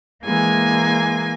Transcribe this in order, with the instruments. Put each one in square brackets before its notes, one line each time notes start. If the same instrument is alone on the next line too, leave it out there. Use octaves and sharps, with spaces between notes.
[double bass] E3 G#3 [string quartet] A#3 G#5